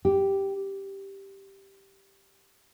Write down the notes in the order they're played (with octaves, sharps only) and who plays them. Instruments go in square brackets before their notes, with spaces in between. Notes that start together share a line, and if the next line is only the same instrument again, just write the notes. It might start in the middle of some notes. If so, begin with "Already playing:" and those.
[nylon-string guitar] G4